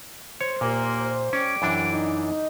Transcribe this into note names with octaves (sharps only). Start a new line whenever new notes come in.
C5 C#5
D#2 A#2 A#3
G3 C#4 G5 D6
F#2 E3 D4
D#4